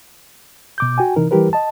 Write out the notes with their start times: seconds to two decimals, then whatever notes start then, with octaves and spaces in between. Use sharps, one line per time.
0.78 B2 D6 G6
0.98 F#4 G5 G#5
1.16 C3 E3 D#4 A#4
1.31 E3 G3 E4 G4 A#4 B4
1.53 D#5 A5